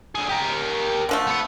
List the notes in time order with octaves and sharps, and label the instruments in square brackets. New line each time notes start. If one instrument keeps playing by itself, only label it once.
[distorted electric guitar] D3 G#4
G4 A#4
[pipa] D3 F3 A3
[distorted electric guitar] B3 F#5